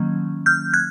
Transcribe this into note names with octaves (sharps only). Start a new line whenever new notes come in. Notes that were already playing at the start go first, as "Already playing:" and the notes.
Already playing: D#3 F#3 A#3 C#4
F6 G6
F#6 G#6